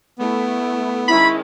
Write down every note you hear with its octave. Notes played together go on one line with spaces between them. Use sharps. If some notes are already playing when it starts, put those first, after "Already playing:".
A3 B3 E4
D#3 G#3 C#4 E4 B5